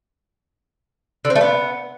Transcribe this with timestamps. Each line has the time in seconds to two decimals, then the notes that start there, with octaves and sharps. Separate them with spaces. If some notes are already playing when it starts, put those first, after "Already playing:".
1.25 D3
1.30 C4
1.35 A3
1.41 B3